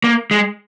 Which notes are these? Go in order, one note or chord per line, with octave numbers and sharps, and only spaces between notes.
A#3
G#3